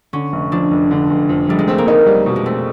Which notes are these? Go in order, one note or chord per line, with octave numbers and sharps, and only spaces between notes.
D3 C#4
F1
F2 D4
F1
D3
F1
F2
F1 G3
G#3
A3 C4
A#3
B3 D#4
G3
B2
G#3
A3 C4